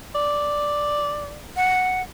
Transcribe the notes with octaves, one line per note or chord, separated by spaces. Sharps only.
D5
F#5